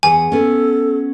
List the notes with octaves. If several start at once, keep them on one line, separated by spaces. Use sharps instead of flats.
E2 G#4 F#5 G#5
B3 C#4 A4